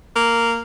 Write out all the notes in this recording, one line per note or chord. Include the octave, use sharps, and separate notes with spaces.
A#3